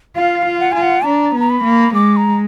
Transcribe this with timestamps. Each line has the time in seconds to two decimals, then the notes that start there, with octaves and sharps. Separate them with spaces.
0.16 F4 F5
0.46 F4
0.60 F#5
0.72 F4 G#5
0.82 F#5
1.05 D4 A#5
1.35 B3
1.40 A#5
1.50 B5
1.64 A#3
1.94 G#3 D6
2.17 A#5